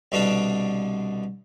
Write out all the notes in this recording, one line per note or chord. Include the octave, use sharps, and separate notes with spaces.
C2 B2 D3 D4